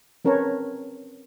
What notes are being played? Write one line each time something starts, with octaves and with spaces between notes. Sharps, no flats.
C4 C#4 A#4 B4 C#5 A5